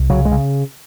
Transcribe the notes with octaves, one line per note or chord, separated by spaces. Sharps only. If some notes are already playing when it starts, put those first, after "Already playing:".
Already playing: C2
C#3 F#3
G#3
C#3